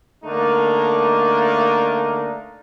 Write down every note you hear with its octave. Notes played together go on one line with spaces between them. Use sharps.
D3 A3 A#3 D4 D#4